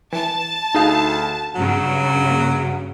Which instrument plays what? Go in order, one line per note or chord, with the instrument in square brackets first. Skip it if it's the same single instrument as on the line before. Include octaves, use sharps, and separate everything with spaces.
[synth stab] E3 [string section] A5
[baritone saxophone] D2 [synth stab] D#4 G#4 F5
[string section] G2 C#3 [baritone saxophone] F#3
[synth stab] A#3